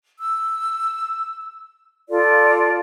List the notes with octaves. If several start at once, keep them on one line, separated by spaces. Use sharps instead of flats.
E6
F4 A4 D5